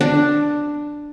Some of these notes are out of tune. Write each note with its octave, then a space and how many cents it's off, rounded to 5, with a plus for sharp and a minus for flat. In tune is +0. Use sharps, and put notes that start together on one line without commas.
D4 +5